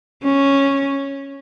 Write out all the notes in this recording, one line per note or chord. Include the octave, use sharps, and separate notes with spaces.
C#4